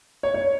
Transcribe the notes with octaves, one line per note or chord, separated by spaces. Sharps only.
C#5
C#5